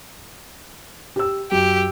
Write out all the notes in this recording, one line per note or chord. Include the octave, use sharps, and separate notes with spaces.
G4 E6
F#2 G4